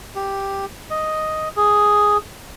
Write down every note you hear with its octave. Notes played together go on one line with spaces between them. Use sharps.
G4
D#5
G#4